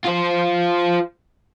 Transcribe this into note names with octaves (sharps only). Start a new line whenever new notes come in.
F4 C5